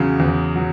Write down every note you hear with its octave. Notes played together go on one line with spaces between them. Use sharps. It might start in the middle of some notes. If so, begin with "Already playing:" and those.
Already playing: E2 C#3 F#3
E2
F#3